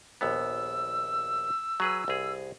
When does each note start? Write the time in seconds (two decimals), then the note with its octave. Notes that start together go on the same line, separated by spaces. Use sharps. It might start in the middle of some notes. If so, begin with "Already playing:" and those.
0.21 A#1 D#2 B3 E6
1.80 F#3 G#4 B4
2.08 C2 G#4